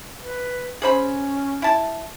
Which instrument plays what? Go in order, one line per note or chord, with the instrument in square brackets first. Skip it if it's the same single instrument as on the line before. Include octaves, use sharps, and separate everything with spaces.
[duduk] B4
[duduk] C#4 [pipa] G#4 C5 B5
[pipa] E4 A5